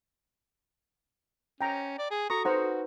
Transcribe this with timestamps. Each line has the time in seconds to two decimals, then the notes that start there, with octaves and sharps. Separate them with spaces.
1.61 C#4 G5 A#5
1.98 D5
2.11 G#4
2.30 F#4 A4 A#5 C#6 D#6
2.45 D#4 F#4 B4 C5 F#5 A#5